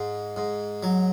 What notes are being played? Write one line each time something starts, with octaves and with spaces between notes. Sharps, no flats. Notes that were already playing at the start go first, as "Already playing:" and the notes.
Already playing: G#2
G#2
F#3